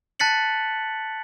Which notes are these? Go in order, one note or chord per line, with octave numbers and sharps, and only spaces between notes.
A5 F#6 A6 B6 C#7 F#7